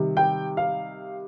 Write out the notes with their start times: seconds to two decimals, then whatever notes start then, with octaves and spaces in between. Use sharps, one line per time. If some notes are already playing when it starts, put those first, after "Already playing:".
Already playing: C3 D#3 G3
0.17 G5
0.57 F5